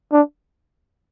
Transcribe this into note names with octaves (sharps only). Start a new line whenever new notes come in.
D4